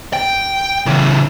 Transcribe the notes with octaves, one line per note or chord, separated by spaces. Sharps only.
G5
C#3 E3